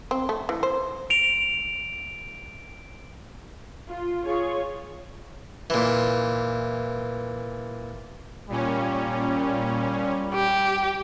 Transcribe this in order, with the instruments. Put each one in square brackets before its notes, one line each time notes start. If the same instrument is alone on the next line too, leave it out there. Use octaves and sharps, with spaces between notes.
[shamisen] C4
A3
E3
C5
[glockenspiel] D7 F7
[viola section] F4
F4 G#4 C#5
[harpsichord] A#2 E3
[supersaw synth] A#2 C#4 [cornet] G3
[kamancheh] G4